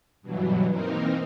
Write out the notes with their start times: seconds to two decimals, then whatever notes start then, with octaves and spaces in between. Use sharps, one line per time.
0.22 G2 B2 E3 F#3
0.71 E3 A#3 C4 D#4 A#4